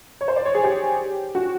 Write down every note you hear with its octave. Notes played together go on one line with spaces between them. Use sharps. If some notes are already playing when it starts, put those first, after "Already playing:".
C#5
C5
D5
C#5
G#4
G4
F#4